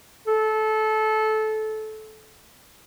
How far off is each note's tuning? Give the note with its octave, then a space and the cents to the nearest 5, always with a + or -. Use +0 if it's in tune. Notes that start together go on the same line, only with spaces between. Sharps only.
A4 -20